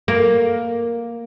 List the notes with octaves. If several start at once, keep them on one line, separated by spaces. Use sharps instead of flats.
A#3